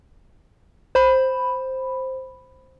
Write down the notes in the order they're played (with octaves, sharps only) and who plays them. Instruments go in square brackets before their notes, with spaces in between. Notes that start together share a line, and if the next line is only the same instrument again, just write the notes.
[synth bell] C5 B5